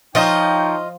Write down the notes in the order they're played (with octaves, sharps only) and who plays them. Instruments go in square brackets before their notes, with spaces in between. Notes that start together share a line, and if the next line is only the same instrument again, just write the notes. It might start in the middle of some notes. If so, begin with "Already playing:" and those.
[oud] F3 [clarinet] D#4 [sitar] F4 D#5 [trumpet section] C#5 G5